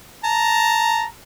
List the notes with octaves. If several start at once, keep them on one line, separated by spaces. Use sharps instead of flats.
A5 A#5